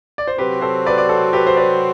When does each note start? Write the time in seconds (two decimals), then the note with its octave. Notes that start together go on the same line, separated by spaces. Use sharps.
0.18 D5
0.27 C5
0.38 C3 F#3 C4 F#4 G4 B4
0.61 A4 C5
0.86 B4 D5
0.98 D5
1.09 A4 C5
1.33 G4 B4
1.47 C5
1.57 B4 D5